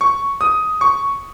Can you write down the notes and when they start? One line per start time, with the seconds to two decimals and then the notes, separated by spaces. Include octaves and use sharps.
0.01 C#6
0.41 D#6
0.81 C#6